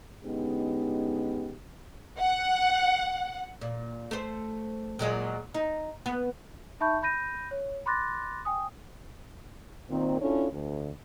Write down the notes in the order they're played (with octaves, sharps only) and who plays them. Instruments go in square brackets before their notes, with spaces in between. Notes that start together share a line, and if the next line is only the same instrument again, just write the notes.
[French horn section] D3 G#3 B3 C#4 D#4 G4
[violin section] F#5
[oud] A#2
A3 C5
A#2 F#3 G#3
D#4
B3
[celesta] D#4 E5 A5 B5 C#6 G6
B5 G6 A#6 D#7
C#5
B5 C6 D6 F#6 A6 A#6
G5 G#5 D#6
[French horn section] A#2 D#3 C4
C#4 D4 E4 F4 A4 C#5
D2